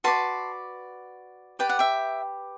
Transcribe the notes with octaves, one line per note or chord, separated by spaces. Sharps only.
F#4 B4 D5 A5 C6
G4 B4 D5 G5
F#5
E5 G5